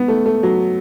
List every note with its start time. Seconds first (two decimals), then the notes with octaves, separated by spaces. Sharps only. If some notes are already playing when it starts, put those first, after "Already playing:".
Already playing: B3
0.08 A3
0.26 A3
0.43 F#3